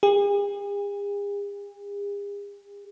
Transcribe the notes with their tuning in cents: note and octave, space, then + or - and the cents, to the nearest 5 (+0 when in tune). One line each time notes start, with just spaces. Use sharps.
G#4 -45